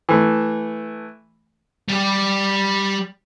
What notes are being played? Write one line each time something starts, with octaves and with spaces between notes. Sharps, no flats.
E3 A3
G3 G4